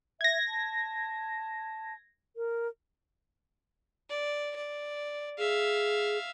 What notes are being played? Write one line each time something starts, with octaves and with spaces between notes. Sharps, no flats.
E5 G#6 A#6
A5
A#4
D5
D5
G#4 E5 F5